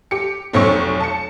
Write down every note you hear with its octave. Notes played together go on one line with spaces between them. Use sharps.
G4 C#7
F1 B1 C4 C#5 C#6
A5 C#7